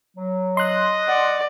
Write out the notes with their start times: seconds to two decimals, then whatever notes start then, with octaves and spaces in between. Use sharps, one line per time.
0.17 F#3
0.57 D#5 C6 F#6
1.08 D5 F#5